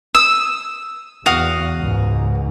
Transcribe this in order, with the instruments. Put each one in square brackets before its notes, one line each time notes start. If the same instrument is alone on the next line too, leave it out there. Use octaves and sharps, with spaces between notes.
[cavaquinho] D#6 [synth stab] E6
[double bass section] E2 [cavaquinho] F#4 F5 D#6
[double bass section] C#2 G#2